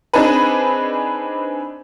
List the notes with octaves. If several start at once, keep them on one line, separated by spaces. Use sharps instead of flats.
C4 D4 D#4 G#4 B4